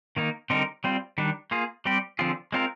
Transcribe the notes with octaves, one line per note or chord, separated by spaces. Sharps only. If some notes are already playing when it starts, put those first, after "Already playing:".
D#3 A#3 D#4
D3 G3 C4 D#4 A#4
G3 C4 F4
D#3 G3 D4
A#3 F4 G#4
G3 C4 G4
D3 F3 C4 F4 G#4
G#3 C4 F4 A#4